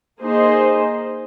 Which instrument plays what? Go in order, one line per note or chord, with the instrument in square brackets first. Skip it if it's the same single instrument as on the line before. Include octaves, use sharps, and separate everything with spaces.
[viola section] A#3 D#4 G#4 C5 D#5